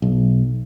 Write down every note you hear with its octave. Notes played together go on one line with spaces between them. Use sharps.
B1